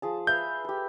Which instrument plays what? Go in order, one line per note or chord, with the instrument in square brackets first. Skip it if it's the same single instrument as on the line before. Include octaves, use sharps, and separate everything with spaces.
[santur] F3 G#4 A5
[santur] B4 E5 F5 [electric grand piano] G6
[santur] G4 A4